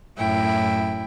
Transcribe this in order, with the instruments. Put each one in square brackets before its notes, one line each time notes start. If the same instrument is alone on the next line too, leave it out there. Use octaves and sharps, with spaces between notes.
[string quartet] F#2 A2 E4 G5